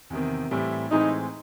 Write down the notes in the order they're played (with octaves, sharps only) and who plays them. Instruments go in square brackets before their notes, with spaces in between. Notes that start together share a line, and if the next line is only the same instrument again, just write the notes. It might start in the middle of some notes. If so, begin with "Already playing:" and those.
[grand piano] E2 C3 D#3
A2 E3 G3 C4 E4
[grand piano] A2 E3 G#3 C4 [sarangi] D#4